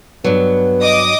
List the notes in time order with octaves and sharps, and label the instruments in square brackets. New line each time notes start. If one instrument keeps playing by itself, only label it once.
[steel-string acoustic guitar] G2 F#3 [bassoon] B3
[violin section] D#5 D6 D#6